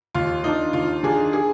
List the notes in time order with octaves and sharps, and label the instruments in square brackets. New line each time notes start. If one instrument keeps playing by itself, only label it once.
[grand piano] D#2 [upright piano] F4
[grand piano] D#3 A#3 D4 [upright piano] D#4
[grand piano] D#2 [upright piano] F4
[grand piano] D#3 A#3 D4 [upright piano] G#4
[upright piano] G#4